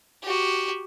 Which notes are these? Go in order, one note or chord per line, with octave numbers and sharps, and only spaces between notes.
F#4 G4